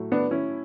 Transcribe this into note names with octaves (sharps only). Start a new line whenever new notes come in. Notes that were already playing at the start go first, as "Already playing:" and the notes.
Already playing: A2 F#3 A3
B3 D4
C#4 E4